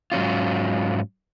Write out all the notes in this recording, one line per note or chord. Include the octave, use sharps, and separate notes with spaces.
G#2 F#3 A#3 C#4 F4